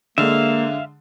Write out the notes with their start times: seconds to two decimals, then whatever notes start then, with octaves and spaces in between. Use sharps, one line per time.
0.18 D3 G#3 A#3 E5 F5